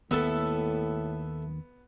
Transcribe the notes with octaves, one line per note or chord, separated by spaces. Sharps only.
D#2 A2 B3 A4 E5